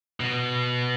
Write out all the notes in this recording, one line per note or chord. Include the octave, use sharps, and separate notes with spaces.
B2